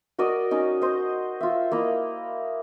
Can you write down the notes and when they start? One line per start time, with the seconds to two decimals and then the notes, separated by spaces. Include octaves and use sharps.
0.18 F#4 A#4 D5 D#5
0.51 C#4 D#4
0.82 C5 D#5
1.41 F4 E5
1.72 A#3 E4 D#5